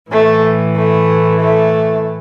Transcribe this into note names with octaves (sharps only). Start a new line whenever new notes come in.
A2 E3 A3
A3
A3